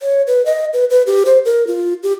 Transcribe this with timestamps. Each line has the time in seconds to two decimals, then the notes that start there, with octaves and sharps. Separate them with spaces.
0.01 C#5
0.27 B4
0.46 D#5
0.73 B4
0.90 B4
1.07 G4
1.26 C5
1.45 A#4
1.67 F4
2.03 G4